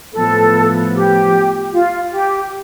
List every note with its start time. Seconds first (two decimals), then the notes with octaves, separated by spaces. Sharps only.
0.14 A2 F3 B3 A4
0.94 G4
1.72 F4
2.12 G4